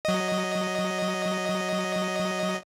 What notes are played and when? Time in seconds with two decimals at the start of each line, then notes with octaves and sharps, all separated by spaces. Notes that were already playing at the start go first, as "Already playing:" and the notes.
0.05 F#3 D#5